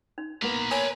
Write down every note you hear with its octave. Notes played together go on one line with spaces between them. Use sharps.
D#4
A#3 B3 B4 A#5
A#4 C#5 G#5 A5